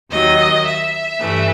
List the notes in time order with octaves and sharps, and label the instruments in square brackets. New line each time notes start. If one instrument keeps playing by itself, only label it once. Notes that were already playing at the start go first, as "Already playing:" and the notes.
[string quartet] D#2 D#3 F#3 D#5
E5
G2 E3 A3